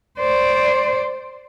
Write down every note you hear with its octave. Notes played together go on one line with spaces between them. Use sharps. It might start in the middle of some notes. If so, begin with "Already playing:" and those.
C5 D5